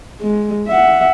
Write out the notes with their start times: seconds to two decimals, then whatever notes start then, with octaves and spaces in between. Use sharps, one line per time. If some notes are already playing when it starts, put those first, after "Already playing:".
0.21 G#3
0.68 E5 F#5